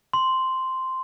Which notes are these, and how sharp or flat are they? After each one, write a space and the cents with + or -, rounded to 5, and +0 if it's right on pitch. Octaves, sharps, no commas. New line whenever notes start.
C6 -5